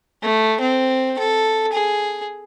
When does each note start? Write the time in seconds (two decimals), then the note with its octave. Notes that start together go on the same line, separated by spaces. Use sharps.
0.22 A3
0.60 C4
1.19 A4
1.72 G#4